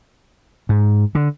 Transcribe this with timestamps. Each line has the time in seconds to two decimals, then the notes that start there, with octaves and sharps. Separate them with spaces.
0.69 G#2
1.15 D3